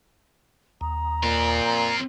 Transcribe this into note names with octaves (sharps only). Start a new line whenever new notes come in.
D#2 A#5
A#2 C4 F4
A#5